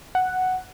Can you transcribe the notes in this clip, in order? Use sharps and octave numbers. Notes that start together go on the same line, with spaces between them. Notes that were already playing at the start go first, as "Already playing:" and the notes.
F#5